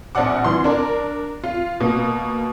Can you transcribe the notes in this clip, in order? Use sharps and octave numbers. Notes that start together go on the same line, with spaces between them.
A#1 C4 D5 F#5 D6
E3 C6
D4 A#4
F4
B2 A#3